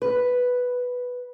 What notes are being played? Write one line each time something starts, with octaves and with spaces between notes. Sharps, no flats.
B4